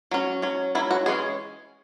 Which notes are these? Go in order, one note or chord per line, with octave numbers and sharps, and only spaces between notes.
F#3 C#4
F#3 C#4
F#3 C#4 E4
F#4
E3 G#3 C#4 G#4